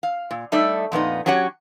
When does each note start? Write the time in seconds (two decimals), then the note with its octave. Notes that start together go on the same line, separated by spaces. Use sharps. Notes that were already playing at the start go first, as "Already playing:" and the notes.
0.03 F5
0.31 A#2
0.52 G3 A3 D#4 D5 E5
0.92 F2 A#2 B3 D#4
1.26 F#3 C#4 G4 C#5 F#5